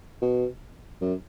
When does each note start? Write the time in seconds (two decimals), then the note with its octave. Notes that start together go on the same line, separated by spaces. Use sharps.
0.22 B2
1.02 F#2